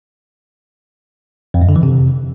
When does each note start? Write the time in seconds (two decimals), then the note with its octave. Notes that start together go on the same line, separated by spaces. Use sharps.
1.54 F2
1.61 F#2
1.69 D3
1.76 E3
1.83 C3